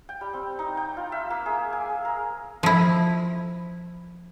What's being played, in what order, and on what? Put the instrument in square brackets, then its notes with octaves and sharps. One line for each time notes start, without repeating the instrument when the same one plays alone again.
[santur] G5
G3
C4
D#4
G5
F4
E5
A#3
G#4
G#5
G#4
A#4
[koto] F3 E4